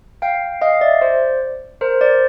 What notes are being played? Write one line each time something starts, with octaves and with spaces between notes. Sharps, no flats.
F5 G5
D#5 F5
D5 E5
C5 D5
A#4 C5
C5 D5